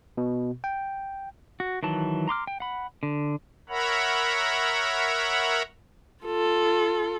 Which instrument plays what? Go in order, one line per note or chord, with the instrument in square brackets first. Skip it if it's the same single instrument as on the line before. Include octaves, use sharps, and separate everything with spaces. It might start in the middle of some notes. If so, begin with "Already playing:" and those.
[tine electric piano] B2
G5
[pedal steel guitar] F#4
D#3 E3 F#3 A5
A#5 C6 D6 F6
G5
F#5 B5
D3
[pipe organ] A#4 C#5 E5 F#5 A#5 B5
[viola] F4 A4